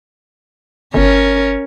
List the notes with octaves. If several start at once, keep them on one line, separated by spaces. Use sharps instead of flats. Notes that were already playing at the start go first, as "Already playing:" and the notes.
G1 C#4 A#4 C#5